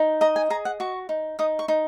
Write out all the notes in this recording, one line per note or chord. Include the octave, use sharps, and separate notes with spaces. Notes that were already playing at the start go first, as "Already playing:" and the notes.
Already playing: D#4
D#5 A#5
G#5
G#4 A#5
F#5
F#4 C#6
D#4
D#4 D#6
C#6
D#4